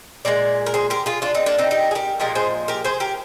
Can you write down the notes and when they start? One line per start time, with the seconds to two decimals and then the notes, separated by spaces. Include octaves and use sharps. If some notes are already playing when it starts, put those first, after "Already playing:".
0.25 A#2 G#3 A#4 D5
0.66 A#4
0.74 G#4 C5
0.90 G4 A#4
1.06 F4 G#4
1.22 D4 F4
1.35 C4 D#4
1.46 A#3 D4
1.58 C4 D#4
1.71 D#4 G4
1.91 G#4
1.95 G4 A#4
2.20 A#2 F3 G#3 G4 A#4
2.35 G#4 C5
2.68 G4 A#4
2.84 G#4 C5
3.00 G4 A#4